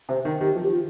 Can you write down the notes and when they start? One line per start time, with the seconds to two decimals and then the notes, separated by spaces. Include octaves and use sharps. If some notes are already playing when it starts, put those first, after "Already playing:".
0.09 C3 C5
0.25 D#3
0.40 D#3 G4
0.56 F3
0.64 G4
0.71 F4